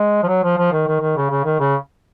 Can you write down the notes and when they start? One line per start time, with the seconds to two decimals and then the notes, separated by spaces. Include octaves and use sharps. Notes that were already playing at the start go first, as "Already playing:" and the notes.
Already playing: G#3
0.23 F3
0.28 F#3
0.44 F3
0.58 F3
0.72 D#3
0.87 D#3
1.01 D#3
1.17 C#3
1.30 C#3
1.45 D#3
1.60 C#3